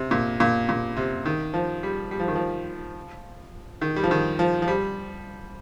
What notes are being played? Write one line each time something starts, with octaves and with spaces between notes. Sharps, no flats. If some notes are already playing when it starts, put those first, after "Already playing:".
Already playing: C3
A#2
A#2
A#2
C3
D#3
F3
G3
G3
F3
D#3
F3
D#3
G3
F3
D#3
F3
F3
G3